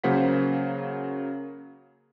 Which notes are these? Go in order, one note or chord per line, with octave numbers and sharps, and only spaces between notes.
C#3 F#3 A#3 C5 F#5 B6